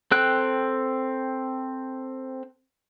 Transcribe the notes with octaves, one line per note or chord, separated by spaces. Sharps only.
C4 A4 G5 F#6